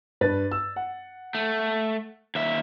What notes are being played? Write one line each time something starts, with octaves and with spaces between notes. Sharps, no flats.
G2 B4 A6
E6
F#5
A3
D#2 E5